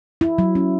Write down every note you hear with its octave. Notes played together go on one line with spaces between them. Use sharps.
E4
F#3
C#4